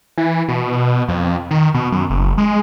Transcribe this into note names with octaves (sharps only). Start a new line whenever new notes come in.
E3
B2
F2
D#3
B2
F#2
F#1
G#3